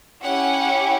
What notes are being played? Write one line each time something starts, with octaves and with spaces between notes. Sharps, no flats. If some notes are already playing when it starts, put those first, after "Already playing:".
C#4 E4 G4 F#5